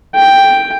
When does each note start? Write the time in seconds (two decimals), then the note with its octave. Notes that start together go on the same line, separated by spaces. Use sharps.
0.15 G5